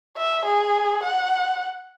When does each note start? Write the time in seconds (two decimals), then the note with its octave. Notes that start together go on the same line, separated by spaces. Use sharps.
0.17 E5
0.45 G#4
1.04 F#5